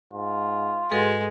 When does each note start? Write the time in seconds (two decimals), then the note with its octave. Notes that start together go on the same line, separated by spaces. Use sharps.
0.13 G#2 F4
0.91 G#2 G#3 F#4 A4 B4